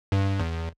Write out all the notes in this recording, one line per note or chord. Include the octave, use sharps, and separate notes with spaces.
G2
E2